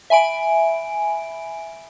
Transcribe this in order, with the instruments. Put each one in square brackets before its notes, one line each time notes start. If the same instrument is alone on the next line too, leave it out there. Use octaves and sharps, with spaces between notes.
[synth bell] E5 G#5 B5 D7